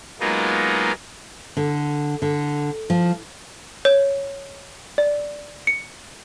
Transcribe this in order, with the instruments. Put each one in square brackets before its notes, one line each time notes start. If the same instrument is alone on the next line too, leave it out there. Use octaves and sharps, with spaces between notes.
[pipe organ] F#3 G#3 A#3 B3 D#4 F4
[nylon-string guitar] D3
D3
F3
[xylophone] C#5
D5
C#7